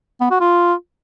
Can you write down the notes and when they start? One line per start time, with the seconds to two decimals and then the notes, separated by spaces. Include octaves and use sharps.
0.21 B3
0.31 F#4
0.40 F4